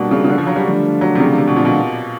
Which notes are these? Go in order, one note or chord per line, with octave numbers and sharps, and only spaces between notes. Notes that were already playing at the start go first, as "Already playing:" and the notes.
Already playing: B2 G3 A#3 D4 F#4
C#3
C#3
D3
F3
F#3
G3
D3 F3 A3 D4
F#3
C3
C#3
C3
B2
A#2
B2